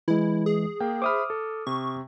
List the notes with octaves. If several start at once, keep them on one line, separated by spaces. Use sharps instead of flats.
E3 G#3 E4
G#4
A#3 G5
C5 E5 B5 D6 D#6 F6
A4
C3 C#6